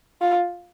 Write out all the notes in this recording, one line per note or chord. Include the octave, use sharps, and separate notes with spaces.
F4